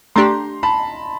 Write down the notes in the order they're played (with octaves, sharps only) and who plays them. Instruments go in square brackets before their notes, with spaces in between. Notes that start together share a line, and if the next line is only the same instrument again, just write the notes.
[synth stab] A3 D4 G4 [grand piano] A#5 C6
[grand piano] A5 B5